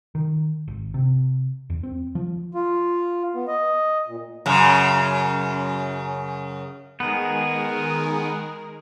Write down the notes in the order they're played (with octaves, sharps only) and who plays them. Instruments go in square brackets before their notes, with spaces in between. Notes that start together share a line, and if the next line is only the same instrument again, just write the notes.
[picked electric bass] D#3
G#1
C3
E2
C4
F3
[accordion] F4
B3
D#5
A#2
[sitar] F#2 C#3
[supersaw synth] D#3 G#3 G#4 [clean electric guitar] B3 [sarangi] A#4